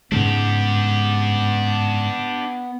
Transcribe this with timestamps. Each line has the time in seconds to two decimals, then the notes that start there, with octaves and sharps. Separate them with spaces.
0.12 G#2 C#3 G#3 B3 D4 G4